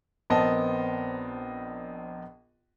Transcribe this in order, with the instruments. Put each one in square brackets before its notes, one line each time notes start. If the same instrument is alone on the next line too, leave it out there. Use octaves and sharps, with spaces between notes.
[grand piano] A#1 B3 C4 A#4 D#5 A5